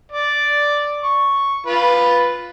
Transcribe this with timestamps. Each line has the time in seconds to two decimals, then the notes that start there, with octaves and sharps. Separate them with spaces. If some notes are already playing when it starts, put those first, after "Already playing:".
0.12 D5
1.04 C#6
1.66 F4 B4